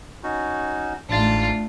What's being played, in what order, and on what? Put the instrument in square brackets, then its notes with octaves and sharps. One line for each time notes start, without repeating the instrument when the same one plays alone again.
[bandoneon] C#4 D#4 F#4
[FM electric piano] A1 A6 [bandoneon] G#2 [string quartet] A3 D4 [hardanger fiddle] F4